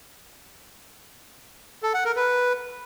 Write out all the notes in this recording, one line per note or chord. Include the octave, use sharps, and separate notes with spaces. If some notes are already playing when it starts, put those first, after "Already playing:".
A4
F#5
A#4
B4